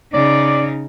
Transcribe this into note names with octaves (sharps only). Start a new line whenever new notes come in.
C#3 D#4 D5